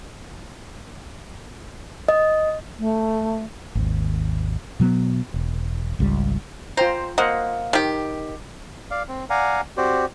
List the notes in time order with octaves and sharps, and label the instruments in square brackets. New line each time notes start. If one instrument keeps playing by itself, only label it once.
[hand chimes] D#5
[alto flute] A3
[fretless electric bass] G#1 D#2
B2 F#3 A#3 B3
E1
G#1 C#2 B2 G3
[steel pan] F4 G5 A#5 [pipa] C5
[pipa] A#3 [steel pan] C5 D#5 F#5
[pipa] D#3 G4
[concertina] D5 F5
C4
D5 F5 F#5 G#5 A#5
C4 F#4 G4 C5 D5